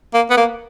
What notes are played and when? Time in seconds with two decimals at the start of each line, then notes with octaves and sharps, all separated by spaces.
0.14 A#3
0.30 B3
0.37 A#3